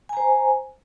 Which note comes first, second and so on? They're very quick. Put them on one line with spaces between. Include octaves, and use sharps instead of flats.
G#5 A#5 C5